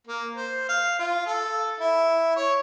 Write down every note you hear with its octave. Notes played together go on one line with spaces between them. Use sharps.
A#3
C5
F5
F4
A4
E4
C#5